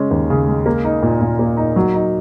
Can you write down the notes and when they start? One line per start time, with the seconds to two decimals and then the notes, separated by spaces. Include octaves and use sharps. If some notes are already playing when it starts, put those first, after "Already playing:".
Already playing: C#3 G#3 C#4
0.11 D#2
0.30 C#3
0.48 G#3
0.66 A#3
0.84 D#4
1.03 A#2
1.21 A#2
1.39 A#3
1.57 D#4
1.76 F#3
1.94 D#4